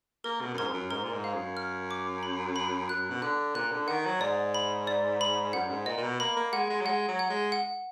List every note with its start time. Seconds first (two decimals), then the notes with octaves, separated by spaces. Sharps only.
0.24 A#3 A#4
0.41 B2
0.54 F#2
0.58 G#2 A#4
0.67 F2
0.74 F#2
0.91 G#2 A#4
1.03 A#2
1.13 G#2
1.24 F5
1.35 F#2
1.57 F6
1.91 D6
2.23 B5
2.56 B5
2.89 F#2 F#6
3.10 B2
3.22 D3 F#6
3.55 A#2 F#6
3.71 D3
3.88 D#3 F#5
4.05 F#3
4.21 G#2 D5
4.55 B5
4.87 D5
5.21 B5
5.53 F#2 F#5
5.70 G#2
5.86 A#2 D#5
5.97 A#2
6.03 B2
6.20 A#3 B5
6.37 A#3
6.53 G#3 F#5
6.70 G#3
6.81 F#3
6.86 G#3 F#5
7.08 F#3
7.19 F#5
7.30 G#3
7.52 F#5